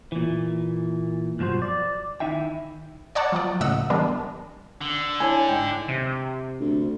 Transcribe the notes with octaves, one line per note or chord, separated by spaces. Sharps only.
A#2 E3
B1 G2 F3 F#4 C5
D5
D#3 A3 D#4 E4 E5 G5
C#5 D5 F#5 A5
F3 F#3 D5
C#2 A2 C#3 D#5 F#5 E6
E3 G3 B3 D4 A#4
D3
E4 C#5 G#5 A5
G#2 G5
C3
D2